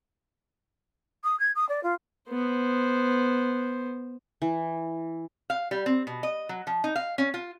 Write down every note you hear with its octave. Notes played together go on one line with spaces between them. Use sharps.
D#6
G#6
D#6
D5
F4
B3 C5
E3
F5
G3
C4
B2
D#5
F#3
F3
D#4
F5
C#4
F4